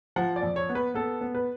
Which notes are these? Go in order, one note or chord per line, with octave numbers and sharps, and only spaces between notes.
F3 F#5
D5
F2
C#5
B3
B4
B3 A4
B3
B4